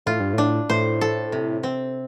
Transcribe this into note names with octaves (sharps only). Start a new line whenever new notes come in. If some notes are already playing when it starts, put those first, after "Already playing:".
A2 F4
G2
A2 D4
A2 C5
A4
C3
C4